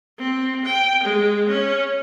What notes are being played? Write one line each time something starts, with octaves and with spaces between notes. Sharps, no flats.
C4
G5
G#3
C#4